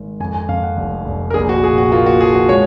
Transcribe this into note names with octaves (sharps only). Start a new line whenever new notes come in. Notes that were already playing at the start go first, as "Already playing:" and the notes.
Already playing: G#1
F2 G#5
G#5
F2 F5
F#5
F1
F1
A#4
A#1 G#4
F#4
A#2 G#4
F#4
A#3 F4
F#4
F3 G#4
F#4
G#3 C#5